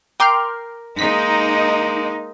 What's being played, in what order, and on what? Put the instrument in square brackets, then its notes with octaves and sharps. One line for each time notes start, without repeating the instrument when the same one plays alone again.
[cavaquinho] A#4 D6 [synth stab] G5 C6 F6
[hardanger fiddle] G#3 A#3 [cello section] D#4 [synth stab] B6